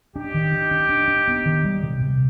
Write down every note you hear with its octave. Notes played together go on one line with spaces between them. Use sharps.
D4 D#4 G4
D#3
D4
D4
D4
D4
B3
D#3
G3
C3
C3